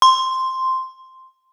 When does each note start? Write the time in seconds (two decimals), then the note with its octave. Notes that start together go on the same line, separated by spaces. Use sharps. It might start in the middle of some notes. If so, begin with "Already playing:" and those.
0.02 C6